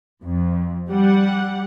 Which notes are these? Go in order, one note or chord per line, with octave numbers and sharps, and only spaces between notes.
F2
G3 F#5